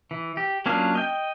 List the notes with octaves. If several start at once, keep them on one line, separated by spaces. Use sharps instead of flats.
E3
G4
F#3 A#3 C#4 D4 F4
D#5 G5